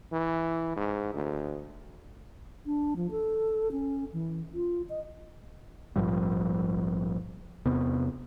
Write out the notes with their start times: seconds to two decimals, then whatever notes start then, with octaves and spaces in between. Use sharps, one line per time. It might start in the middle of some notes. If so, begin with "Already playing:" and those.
0.12 E3
0.76 G#2
1.14 D2
2.65 D4
2.96 F3
3.11 A4
3.72 C#4
4.13 E3
4.54 F4
4.89 D#5
5.96 A#1 G#2 F3 G3
7.66 E2 C3 B3